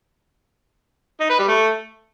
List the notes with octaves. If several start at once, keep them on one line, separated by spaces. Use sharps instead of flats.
D#4
B4
G3
A3